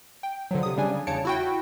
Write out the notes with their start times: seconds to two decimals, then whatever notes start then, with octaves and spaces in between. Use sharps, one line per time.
0.23 G5
0.51 D3 F3 F#3
0.63 C3 D#6
0.77 C#3 G3 D4 G#5
1.07 E2 C#3 C#5 A5 C#7 D7
1.25 E4 F#4 G5